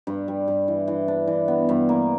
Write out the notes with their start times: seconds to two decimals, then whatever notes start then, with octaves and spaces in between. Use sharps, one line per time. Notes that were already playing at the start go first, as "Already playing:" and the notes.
0.07 G2
0.28 G3
0.48 G2
0.68 E3
0.88 E3
1.08 D4
1.28 E3
1.48 B3
1.69 G2
1.89 A#3